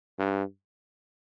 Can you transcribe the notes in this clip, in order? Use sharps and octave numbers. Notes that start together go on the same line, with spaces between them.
G2